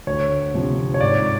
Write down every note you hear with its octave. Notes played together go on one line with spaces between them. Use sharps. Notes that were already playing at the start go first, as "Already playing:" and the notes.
D2 C#5
C3 F3
C#5
G#2 D5